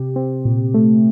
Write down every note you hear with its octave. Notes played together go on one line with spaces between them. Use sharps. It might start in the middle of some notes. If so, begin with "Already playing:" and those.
Already playing: C3 G4
C4
A#2
A3